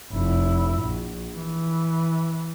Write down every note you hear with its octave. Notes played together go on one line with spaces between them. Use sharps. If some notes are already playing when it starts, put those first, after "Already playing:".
F1 E4
A#1
E3